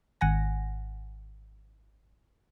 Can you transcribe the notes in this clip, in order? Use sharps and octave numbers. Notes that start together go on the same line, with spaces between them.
G#1 F#5 G#5 A#6